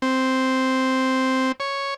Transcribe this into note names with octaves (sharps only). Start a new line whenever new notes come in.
C4
C#5